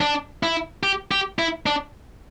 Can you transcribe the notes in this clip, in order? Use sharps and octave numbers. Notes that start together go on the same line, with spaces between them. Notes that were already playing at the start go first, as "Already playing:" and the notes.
D4
E4
G4
G4
E4
D4